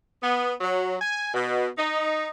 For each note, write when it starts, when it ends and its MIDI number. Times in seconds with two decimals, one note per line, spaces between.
0.21 0.53 59
0.61 0.95 54
1.00 1.28 80
1.33 1.68 47
1.77 2.28 63